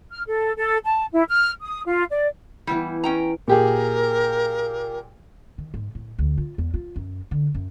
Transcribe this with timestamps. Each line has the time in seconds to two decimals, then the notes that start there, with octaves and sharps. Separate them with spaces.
0.11 F6
0.27 A4
0.56 A4
0.84 A5
1.12 E4
1.28 F6
1.61 D#6
1.86 F4
2.11 D5
2.67 E3 G3 B3 E4
3.04 C#4 G5 A#5
3.48 A#2 G4 G#4 A#4
5.58 D#3
5.74 G#2
5.95 A2
6.19 D2
6.38 F4
6.58 E2
6.74 F4
6.96 F#2
7.31 D3
7.54 F#2